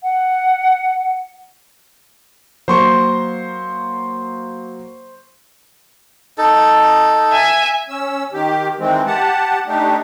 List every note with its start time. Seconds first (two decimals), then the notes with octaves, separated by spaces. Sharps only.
0.02 F#5
2.68 F#3 A#3 C5 C6 C#6
6.38 D#4 A4
7.32 E5 G#5
7.89 C#4 E6
8.33 D#3 G4
8.79 D#3 E3 G#3 C4
9.06 G4 F#5 A5
9.67 A3 D4 D#4 G4